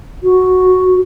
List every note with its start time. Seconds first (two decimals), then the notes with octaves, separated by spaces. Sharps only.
0.23 F#4